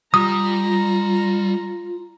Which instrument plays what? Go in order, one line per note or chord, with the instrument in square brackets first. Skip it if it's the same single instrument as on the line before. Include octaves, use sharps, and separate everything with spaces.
[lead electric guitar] G3 [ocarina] F4 [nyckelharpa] A#5 [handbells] D#6